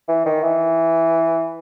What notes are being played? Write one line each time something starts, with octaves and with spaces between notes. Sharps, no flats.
E3
D#3
E3